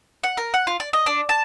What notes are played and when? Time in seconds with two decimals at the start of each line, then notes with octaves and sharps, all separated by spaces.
0.24 F#5
0.37 A#4
0.54 F#5
0.67 F4
0.80 D5
0.93 D#5
1.06 D4
1.29 A5